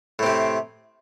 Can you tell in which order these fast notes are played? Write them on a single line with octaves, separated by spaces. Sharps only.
A2 C4 C3